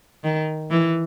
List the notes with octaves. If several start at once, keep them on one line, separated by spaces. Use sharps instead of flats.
D#3
E3